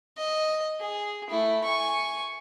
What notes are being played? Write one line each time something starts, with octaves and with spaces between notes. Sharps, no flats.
D#5
G#4
A3 E4
G#5 C#6